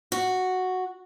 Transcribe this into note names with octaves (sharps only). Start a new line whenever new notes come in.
F#4